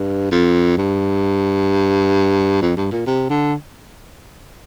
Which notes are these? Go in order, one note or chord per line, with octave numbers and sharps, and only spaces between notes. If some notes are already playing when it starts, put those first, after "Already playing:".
Already playing: G2
F2
G2
F2
G2
A#2
C3
D3